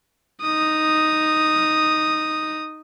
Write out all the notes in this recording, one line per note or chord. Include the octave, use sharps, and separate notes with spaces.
D#4 D#6